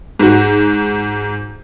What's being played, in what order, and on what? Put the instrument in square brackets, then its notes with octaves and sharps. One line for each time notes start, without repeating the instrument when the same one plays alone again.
[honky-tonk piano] G#2 F#4